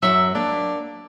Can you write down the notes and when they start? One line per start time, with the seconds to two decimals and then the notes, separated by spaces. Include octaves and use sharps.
0.02 F#2 F#3 E5
0.35 A#3 D4